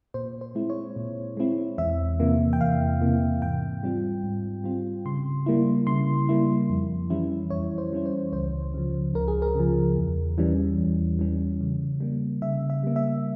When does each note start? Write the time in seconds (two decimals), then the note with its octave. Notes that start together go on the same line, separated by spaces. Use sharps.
0.14 A#2 C5
0.41 C5
0.55 G#3 C4 E4
0.70 C#5
0.96 A#2
1.37 G#3 C4 E4
1.78 E2 E5
2.20 C3 E3 A#3
2.53 G5
2.61 E2 F5
3.01 C3 E3 A#3
3.41 G#2 G5
3.83 G3 C4 F4
4.23 G#2
4.64 G3 C4 F4
5.05 C#3 C6
5.46 G3 A#3 E4
5.87 C#3 C6
6.29 G3 A#3 E4
6.70 F2
7.10 E3 G3 C#4 E4
7.50 F2 C#5
7.78 C5
7.92 E3 G3 C#4 E4
8.06 C5
8.33 C#2 C5
8.74 C#3 F3
9.14 C#2 A#4
9.28 G#4
9.42 A#4
9.55 C#3 F3
9.96 E2
10.38 E3 G3 C#4
10.78 E2
11.19 E3 G3 C#4
11.61 C#3
12.00 G3 A#3
12.42 C#3 E5
12.70 E5
12.83 G3 A#3
12.96 E5